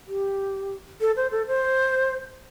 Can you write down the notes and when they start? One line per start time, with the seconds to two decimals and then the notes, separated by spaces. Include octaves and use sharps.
0.07 G4
1.01 A4
1.16 C5
1.32 A4
1.47 C5